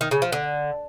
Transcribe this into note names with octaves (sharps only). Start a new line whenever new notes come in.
D#3
C#3
F3
D3